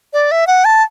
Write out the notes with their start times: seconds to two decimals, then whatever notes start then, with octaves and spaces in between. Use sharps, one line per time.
0.13 D5
0.31 E5
0.47 F#5
0.65 A5